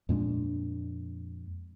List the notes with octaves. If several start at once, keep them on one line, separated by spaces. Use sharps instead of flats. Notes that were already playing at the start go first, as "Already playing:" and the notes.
F2 A#2 G#3 D4